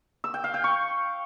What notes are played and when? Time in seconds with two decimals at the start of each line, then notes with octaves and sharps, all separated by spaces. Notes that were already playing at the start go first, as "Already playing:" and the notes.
0.24 E6
0.34 G5
0.44 F5
0.54 G5
0.64 C#6